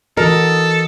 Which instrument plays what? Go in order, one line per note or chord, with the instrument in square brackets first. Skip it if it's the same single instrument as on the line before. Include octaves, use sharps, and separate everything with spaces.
[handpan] E3 F#4 D#5 [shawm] A4 [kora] A#4